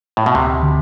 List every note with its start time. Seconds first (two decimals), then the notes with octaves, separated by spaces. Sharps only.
0.17 A2
0.26 B2
0.35 D2 C3
0.63 D3